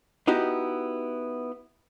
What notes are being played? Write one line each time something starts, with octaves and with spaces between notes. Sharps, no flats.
B3 D#4 E4 F#4 G4